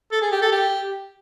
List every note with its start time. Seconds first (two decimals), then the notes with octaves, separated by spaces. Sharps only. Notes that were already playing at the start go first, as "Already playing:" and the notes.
0.12 A4
0.22 G#4
0.32 G4
0.42 A4
0.52 G4